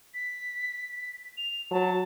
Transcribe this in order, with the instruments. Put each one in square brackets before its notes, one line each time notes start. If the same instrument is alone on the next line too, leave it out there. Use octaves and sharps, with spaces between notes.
[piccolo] B6
F7
[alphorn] F#3 [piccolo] A5